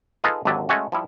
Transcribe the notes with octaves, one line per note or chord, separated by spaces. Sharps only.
D#4 F4 G#4 A4 B4 D#5
G#1 D#2 D3 F#3 D5 E5
G#3 A3 C#4 F#4
F3 G3 E4